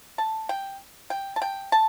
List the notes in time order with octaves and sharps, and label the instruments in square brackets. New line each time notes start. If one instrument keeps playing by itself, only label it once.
[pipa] A5
G5
G5
A5
G5
A5